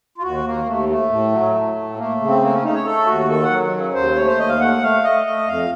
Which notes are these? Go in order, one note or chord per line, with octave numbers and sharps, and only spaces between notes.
F4
D#2 F#4
D#2 A#3
D#2 A3
A3
A2
F#3
A2
A2
A3 A#3
C#3
C4
A3 A#3
C#4
A3 D#4
C#5
A3 A4
D#2 F#4
D#3 A4
F#5
F#3
C#3
D#2 C5
A3 C#5
C5
D#2 D#5
F5
A3 F#5
A3 F5
A3 D#5
A3 D#5
F2 F5